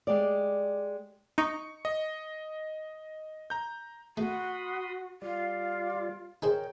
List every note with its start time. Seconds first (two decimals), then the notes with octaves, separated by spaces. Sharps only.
0.07 G#3 G4 D5
1.38 D#4 C#6 C#7
1.85 D#5
3.50 A#5 G6
4.17 A3 F#4 B5 C6 D#6
5.22 G3 F4 D5
6.42 D#4 G#4 A#4 C5 C#5 G5